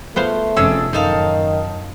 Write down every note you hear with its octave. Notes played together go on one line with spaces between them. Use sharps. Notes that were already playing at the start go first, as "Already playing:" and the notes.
A3 B3 F4 C5
F1 F2 C#4 D4 G#4 E6
F#2 A2 D#3 D#4 A4 F5